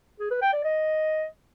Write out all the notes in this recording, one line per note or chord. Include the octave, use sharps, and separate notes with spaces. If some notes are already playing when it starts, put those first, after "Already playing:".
G#4
B4
G5
D5
D#5